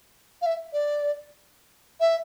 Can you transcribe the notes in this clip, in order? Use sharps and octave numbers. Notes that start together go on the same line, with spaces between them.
F5
E5
D5
E5